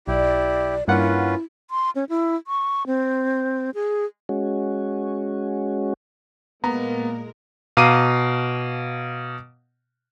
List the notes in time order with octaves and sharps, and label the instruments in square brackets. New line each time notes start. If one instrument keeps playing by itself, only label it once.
[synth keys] B1 [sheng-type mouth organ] E4 G4 [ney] D5
[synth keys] G2 A#3 F#5 [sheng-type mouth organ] C#4 F4 B4 [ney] E4
[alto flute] C6
C#4
E4
C#6
C4
G#4
[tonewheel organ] G#3 C#4 F#4
[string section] A#2 G#3 A#4 [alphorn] A#3 [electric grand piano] B3 [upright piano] A#5
[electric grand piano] B2 F5 A#5 D6 C7 D#7